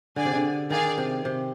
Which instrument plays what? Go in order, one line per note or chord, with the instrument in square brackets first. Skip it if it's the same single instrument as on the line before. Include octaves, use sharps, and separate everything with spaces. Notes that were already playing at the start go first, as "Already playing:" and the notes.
[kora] D3 [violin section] G#4 D5 G#5
[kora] C3
D3
[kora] D#3 [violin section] G#4 D5 F5 G#5
[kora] C3
C3